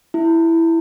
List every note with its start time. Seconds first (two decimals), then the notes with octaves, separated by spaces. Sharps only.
0.14 E4